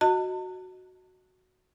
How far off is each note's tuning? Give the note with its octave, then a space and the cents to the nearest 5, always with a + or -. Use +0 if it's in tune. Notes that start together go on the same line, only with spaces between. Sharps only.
F#4 +0 D#5 +0 A5 +40